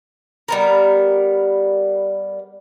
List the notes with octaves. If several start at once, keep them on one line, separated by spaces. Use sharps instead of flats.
G3 B3 A#4